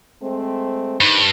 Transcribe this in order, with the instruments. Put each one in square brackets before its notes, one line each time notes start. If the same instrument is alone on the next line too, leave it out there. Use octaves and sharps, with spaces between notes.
[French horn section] G#3 A3 C4
[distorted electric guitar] G2 [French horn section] D#3 D#4 C5